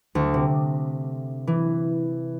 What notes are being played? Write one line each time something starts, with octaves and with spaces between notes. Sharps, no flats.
D2
C3
E3